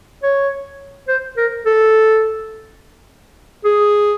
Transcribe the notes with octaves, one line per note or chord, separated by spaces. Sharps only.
C#5
C5
A#4
A4
G#4